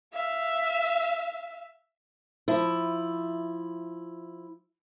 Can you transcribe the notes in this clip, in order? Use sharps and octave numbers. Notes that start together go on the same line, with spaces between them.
E5 F5
F3 E4